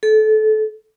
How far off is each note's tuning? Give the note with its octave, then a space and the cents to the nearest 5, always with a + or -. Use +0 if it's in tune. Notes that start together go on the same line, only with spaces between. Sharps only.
A4 -25